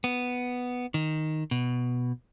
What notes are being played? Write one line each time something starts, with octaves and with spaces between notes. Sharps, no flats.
B3
D#3
B2